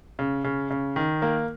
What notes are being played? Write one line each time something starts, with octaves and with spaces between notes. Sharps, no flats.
C#3
C#3
C#3
D#3
A#3